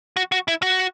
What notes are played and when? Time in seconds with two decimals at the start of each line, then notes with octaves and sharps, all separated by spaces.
0.17 F#4
0.32 F#4
0.48 E4
0.62 F#4